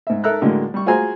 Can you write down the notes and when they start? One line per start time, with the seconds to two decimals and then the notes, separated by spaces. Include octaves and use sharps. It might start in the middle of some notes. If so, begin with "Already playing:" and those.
0.07 G#2 E5
0.24 A4 A#4 E5 A#5 E6 F#6
0.41 A2 D3 F#3 G#3 A#3
0.74 G3 C#6
0.86 F4 F#4 G#4 C5 G#5 A#5